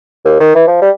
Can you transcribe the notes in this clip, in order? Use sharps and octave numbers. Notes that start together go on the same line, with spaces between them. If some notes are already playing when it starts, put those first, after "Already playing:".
D#2
D#3
E3
F3
G3